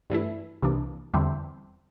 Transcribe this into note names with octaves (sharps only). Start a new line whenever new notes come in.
G2 E3 A3 E4
C2 C3 E3 A#3 D4
E2 D3 G3 C4 E4